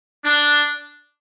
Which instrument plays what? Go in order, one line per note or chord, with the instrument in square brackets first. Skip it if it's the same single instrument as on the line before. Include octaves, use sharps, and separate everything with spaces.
[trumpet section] D4